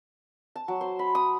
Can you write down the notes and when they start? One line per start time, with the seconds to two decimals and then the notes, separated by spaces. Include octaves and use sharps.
0.56 A5
0.68 F#3
0.81 C5
0.99 B5
1.15 D#6